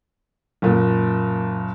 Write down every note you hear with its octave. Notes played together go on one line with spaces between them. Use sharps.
F#1 A#2